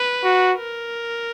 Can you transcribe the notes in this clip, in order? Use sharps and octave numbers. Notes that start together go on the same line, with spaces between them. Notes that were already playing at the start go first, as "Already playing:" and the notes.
Already playing: B4
F#4
A#4